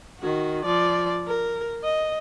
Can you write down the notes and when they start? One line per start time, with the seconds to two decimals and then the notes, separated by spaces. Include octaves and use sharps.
0.20 D#3 F#4
0.65 F3 D5
1.27 A#4
1.84 D#5